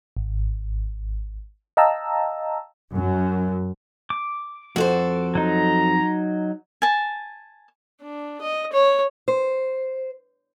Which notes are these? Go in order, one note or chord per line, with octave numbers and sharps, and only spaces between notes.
G#1
D#5 F5 G5 A5 A#5 E6
F#2
D6
F2 F#4 A4 C5
F#3 D#4 A#5
G#5 A5
D4
D#5
C#5
C5